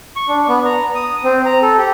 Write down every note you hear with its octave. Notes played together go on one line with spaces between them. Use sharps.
C#6
D4
B3
A#5
D#6
C4
A#5
A4
G4